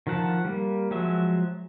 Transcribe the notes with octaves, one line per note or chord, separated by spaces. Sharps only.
D#3 F3 F4 F#5 A5
G3 A#3
F3 F#3 G#3 F#4 E5